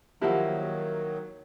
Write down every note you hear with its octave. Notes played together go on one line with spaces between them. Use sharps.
D#3 F3 F#3 A#3 E4 G4 F#5